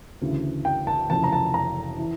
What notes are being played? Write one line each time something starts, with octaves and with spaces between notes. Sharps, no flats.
D2 C#3 E3
G5
A5
F1 F2 C#3 E3 A5
A#5
A5
A#5
E3